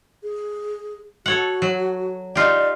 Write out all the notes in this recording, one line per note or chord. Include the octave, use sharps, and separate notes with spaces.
G#4
F#4 A4 C#5 F#5
F#3
D#4 F4 G4 D5